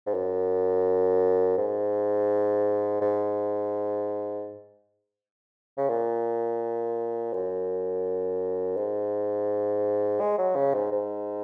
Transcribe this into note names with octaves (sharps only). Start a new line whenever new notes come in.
G#2
F#2
G#2
G#2
C#3
A#2
F#2
G#2
G#3
F#3
C#3
G#2
G#2